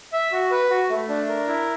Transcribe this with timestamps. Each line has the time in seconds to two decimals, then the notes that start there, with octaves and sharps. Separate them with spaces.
0.13 E5
0.32 F#4
0.51 B4
0.70 F#4
0.90 A3
1.09 D4
1.28 A#4
1.47 E4